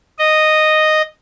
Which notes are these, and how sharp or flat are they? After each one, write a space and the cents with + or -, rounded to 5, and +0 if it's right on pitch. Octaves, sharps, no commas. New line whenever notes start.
D#5 -5